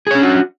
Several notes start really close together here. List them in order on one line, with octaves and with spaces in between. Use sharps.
G#4 C#5 C#4 D4 F#4